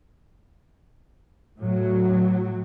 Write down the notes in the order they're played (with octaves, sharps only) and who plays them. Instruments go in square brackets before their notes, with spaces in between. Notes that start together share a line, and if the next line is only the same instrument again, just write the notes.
[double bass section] A2 F#3